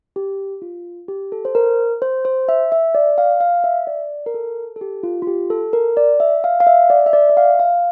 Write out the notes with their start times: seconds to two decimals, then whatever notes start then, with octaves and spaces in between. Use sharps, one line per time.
0.16 G4
0.62 F4
1.08 G4
1.32 A4
1.45 C5
1.55 A#4
2.02 C5
2.25 C5
2.49 E5
2.72 E5
2.95 D5
3.18 F5
3.40 F5
3.64 E5
3.87 D5
4.26 A#4
4.34 A4
4.76 A4
4.81 G4
5.03 F4
5.22 F4
5.27 G4
5.50 A4
5.73 A#4
5.97 D5
6.20 E5
6.44 F5
6.60 F5
6.67 E5
6.90 D5
7.06 E5
7.13 D5
7.30 E5
7.37 F5
7.59 F5